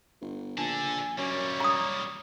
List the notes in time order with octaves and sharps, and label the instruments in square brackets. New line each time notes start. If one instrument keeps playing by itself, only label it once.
[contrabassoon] G1
[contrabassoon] A#1 [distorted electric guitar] D4 A4 [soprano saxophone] G#5
[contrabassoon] F#2 [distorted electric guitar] G3 A#3 [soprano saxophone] C#5
[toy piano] A#5 D#6